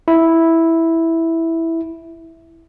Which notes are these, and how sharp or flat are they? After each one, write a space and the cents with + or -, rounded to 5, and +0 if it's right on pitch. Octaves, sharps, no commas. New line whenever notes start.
E4 -5